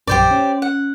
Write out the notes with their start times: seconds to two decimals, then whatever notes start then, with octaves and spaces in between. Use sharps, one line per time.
0.07 A#1 F#2 G4 C5 D5
0.31 C#4
0.62 F#5